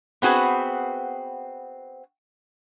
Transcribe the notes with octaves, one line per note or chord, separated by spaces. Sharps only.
B3 C4 F#4 G#4 B4